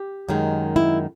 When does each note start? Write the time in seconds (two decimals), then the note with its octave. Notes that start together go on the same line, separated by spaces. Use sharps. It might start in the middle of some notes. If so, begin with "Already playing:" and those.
Already playing: G4
0.28 F#2 D#3 G#3
0.76 E4